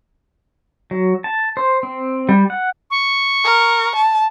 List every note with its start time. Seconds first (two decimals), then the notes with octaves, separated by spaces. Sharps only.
0.91 F#3
1.24 A5
1.57 C5
1.83 C4
2.29 G3
2.50 F#5
2.91 C#6
3.44 A#4
3.95 A5